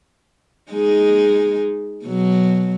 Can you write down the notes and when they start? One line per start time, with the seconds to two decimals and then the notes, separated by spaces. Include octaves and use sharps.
0.71 G#3 D#4 G#4
2.04 B2 F#3